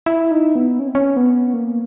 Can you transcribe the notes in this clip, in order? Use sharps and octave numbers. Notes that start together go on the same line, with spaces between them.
E4
D#4
B3
C#4
C4
C#4
B3
A#3